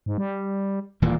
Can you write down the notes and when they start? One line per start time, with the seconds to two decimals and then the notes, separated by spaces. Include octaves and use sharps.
0.06 G#2
0.18 G3
1.02 D#1 A#2 E3 A#3